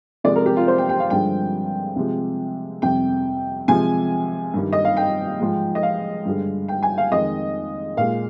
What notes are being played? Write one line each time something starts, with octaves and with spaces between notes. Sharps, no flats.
C3 F3 G#3 D5
A#4
G4
F4
C5
G5
G5
F5
G2 D3 F3 G#3 G5
C3 F3 G#3
F2 C3 G3 G5
C3 F3 G#3 G#5
G2 D#3 G3
D#5
F5
G5
G#2 F3 G#3
D#5
F5
G2 D3 G#3
G5
G#5
F5
F2 D#3 G#3 D#5
A#2 G#3 F5